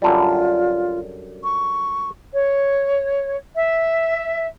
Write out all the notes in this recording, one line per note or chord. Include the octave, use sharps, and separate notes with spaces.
F#2 D3 G3 F4
C#6
C#5
E5